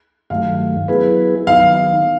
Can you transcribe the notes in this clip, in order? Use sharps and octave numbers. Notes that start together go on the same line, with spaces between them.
G2 D#3 F#3 A3 F5
F#3 B3 E4 G#4 B4
D#3 F#3 B3 D#4 F5